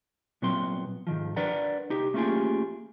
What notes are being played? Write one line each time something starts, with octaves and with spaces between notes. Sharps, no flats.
A#2 F#3 B3 C4 C6
G#2 D#3 F3
D4 A#4 B4 D5 F#5 A#5
C2 D#4 G4
A3 A#3 C#4 F4 G4 G#4